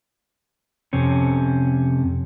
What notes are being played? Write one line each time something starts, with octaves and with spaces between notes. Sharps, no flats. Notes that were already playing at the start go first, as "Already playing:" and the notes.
F2 C3 C#4